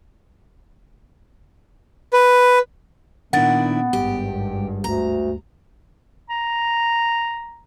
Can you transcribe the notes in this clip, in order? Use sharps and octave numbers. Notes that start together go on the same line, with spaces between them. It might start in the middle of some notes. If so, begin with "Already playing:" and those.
B4
A#2 D#3 B3 D4 E4 F#5 A6
G#1 G2 G4
D2 A#5
A#5